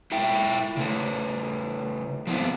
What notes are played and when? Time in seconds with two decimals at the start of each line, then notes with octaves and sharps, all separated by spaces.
0.12 E4 F4 E5 G5
0.77 C#3 A3
2.27 F3 B3 C4 E4